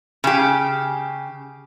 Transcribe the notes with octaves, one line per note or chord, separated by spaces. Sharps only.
C#3 G4